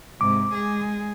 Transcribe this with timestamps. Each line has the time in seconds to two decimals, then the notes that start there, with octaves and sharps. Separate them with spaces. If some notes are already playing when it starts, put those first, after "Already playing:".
0.21 G#2 C3 D6
0.52 G#3 G#4